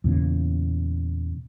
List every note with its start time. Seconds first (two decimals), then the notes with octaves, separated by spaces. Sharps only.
0.04 E2 A#2 C#3